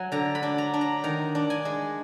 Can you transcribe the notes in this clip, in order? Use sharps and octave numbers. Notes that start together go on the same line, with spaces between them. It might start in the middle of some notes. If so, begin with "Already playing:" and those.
Already playing: F#3 F#5 G#5
D3 A#5
B5
D4
A#5
D4
A#5
D#3 A#5
D4
G#5
G#3